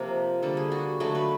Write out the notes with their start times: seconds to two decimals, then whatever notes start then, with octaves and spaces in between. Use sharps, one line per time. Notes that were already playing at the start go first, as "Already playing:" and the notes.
Already playing: C3 F3 A#3 A#4
0.42 D3 G3 A#3 A4
0.57 G#4
0.72 F#4
1.00 D3 F#3 A3 F#4
1.15 B4